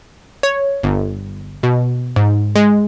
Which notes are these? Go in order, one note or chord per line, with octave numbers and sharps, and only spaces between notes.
C#5
G1
B2
G#2
G#3